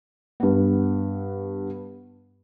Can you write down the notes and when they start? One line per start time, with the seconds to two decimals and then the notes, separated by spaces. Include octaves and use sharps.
0.40 G2 B3